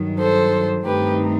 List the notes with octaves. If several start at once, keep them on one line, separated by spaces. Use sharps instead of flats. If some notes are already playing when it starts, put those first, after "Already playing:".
Already playing: G2 D#3 F#3
A4 C5
G2 D#3 A3 C4 D#4 G4 B4